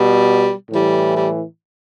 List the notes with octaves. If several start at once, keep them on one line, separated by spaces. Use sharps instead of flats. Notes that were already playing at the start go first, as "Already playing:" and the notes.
Already playing: B2 G3
A2 E3 G3
G3